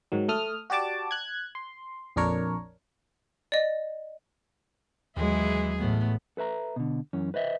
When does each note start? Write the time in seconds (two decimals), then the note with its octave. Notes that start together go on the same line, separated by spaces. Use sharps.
0.12 G#2 D#3 F#3
0.28 A3 A4 D#6 F6
0.70 F#4 G4 D5 A5 D6
1.11 F#6 G#6
1.55 C6
2.16 A#1 F2 D4 A#4 C#5
3.52 D5 D#5
5.17 D#2 E3 F#3 G#3 E4 G#4
5.79 A1 A2 A3 B3
6.37 A4 B4 E5 A#5
6.76 B2 D3
7.13 F#2 E3 C#4
7.34 B4 C5 D#5 E5